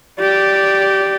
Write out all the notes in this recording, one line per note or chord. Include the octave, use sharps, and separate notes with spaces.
G4 D5